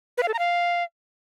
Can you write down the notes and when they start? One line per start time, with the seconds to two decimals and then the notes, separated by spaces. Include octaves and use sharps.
0.18 B4
0.23 F5
0.28 A4
0.34 A#5
0.39 F5